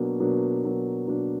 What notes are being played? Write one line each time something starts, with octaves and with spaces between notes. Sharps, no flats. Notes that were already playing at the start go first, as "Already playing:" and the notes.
Already playing: B2 F#3 A#3 D4
B2 F#3 A#3 D4
B2 F#3 A#3 D4
B2 F#3 A#3 D4